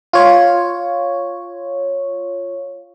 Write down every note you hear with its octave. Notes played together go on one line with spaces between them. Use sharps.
F4 C#5